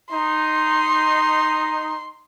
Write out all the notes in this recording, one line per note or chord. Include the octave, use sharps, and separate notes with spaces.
D#4 C6